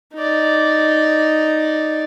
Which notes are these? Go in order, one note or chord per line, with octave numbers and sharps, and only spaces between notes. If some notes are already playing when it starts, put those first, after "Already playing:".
D#4 D5